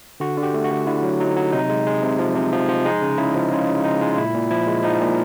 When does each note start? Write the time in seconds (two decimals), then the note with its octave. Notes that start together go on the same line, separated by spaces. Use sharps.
0.20 D3 F#4
0.37 D3
0.43 G4
0.54 A3
0.64 F#4
0.71 D3
0.87 D3 E4
1.03 F#3
1.20 F#3 D#4
1.36 F#3
1.53 C3 D#4
1.69 G#3
1.87 G#3
2.03 C3
2.19 F3
2.35 C3
2.52 F3
2.69 F3
2.85 G#3 D#4
3.02 C#3
3.18 C#3 E4
3.35 F3
3.51 C#3 F4
3.68 C#3
3.84 G#3 D#4
4.01 G#3
4.07 F4
4.18 A#2 E4
4.34 A#2
4.51 F3 E4
4.67 G#3
4.84 F3 D#4
5.00 A#2